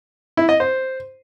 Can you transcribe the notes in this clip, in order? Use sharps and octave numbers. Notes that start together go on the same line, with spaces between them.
E4
D#5
C5